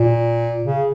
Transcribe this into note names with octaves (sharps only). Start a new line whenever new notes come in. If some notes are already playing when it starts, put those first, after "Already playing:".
Already playing: A#2
C#3